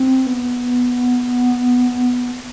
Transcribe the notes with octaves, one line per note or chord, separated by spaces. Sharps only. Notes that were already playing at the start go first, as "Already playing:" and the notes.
Already playing: C4
B3